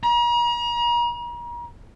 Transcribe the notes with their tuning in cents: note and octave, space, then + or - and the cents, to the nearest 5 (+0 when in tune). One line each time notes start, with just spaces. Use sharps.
A#5 +40